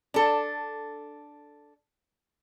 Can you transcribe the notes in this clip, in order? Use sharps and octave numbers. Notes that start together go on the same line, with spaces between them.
D4 A4